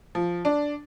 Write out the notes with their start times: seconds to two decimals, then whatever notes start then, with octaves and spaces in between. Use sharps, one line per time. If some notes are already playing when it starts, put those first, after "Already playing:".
0.15 F3
0.45 D4